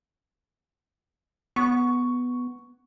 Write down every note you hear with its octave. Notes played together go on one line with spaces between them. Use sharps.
B3 C#6